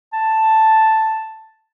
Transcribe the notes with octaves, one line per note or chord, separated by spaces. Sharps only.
A5